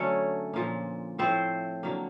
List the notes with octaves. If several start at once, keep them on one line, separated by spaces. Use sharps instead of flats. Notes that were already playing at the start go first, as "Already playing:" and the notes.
Already playing: D3 F#3 A3 C#4 C#5
A#2 F3 A#3
A2 F3 A3 C4 C5
D3 F#3 A#3